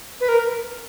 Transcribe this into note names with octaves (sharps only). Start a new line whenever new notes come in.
B4
A#4